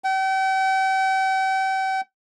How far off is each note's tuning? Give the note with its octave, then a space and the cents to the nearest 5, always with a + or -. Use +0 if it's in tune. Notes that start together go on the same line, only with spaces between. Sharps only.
G5 -40